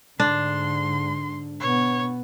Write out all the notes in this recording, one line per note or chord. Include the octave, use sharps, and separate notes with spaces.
G#2 D3 D4 C6
B2 B3 C#5